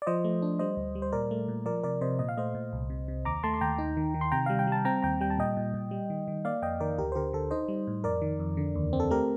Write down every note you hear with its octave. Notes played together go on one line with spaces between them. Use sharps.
D5
F3 C5 D#5
A3
D4
G3 C5 D#5
D2
G3
C5
A#2 A#4 D5
A3
A#2
F3 A#4 D5
C3 A#4 D5
C3 C5 D#5
A#2 D#5
F5
A3 C5 D#5
A#2
C2
C3
C3
D#2 A#5 D6
A3 A5 C6
C6
D#2 G5 A#5
D#4
D#3
D#3
C6
C3 G5 A#5
G3 F5
G5
G3 A5
C4 G5 A#5
D#2 G5 A#5
G3 G5
A5
A#2 D#5 G5
A#2
A#2
G3
D#3
D#3
A#3 D5 F5
F2 D#5 G5
D#3 A#4 D5
D2 G4 A#4
C5
D3 G4 A#4
D3 A4
D#4 C5 D#5
G3
A2
F2 A#4 D5
D#3
F2
D3
D#2
C4
A4
A3 G4 A#4